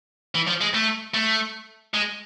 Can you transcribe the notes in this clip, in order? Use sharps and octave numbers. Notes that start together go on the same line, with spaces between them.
E3
F3
G#3
A3
A3
G#3